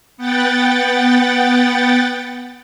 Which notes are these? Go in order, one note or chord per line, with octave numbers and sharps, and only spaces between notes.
B3 F#5 G5 A6